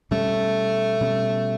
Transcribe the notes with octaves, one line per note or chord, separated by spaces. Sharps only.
B2 G3 A3 C#4
B2 G3 C#4